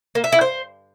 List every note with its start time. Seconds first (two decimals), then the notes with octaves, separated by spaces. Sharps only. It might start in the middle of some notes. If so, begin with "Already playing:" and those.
0.15 A#3
0.24 E5
0.33 E4
0.41 C5